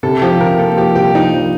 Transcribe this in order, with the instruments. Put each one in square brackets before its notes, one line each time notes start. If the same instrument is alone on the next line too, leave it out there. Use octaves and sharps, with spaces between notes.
[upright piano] C3 [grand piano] A4
[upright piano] F3 [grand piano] G4
[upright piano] C3 [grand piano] A#4
[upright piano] A#3 [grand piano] A4
[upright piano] F3 [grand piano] G4
[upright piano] C2 [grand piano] G4
[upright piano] F3 [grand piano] D#4
[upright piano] F3